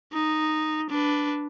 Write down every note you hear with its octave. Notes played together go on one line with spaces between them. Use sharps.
D#4
D4 B4